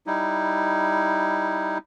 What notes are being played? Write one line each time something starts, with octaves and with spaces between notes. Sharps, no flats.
G3 D#4 E4